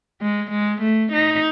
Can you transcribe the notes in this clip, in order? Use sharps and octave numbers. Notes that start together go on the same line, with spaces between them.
G#3
G#3
A3
D#4